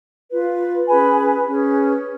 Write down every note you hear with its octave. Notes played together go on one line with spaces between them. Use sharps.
F4 B4
C#4 G#4 B4 G#5 B5
C#4 G#4 B4